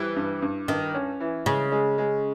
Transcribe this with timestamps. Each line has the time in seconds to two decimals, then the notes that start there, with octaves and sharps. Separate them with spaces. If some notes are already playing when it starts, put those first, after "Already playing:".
Already playing: E3 G3
0.16 G2
0.42 G2
0.68 G2 D#3
0.94 C#4
1.20 E3
1.46 C#3 G#3
1.72 G#3
1.98 G#3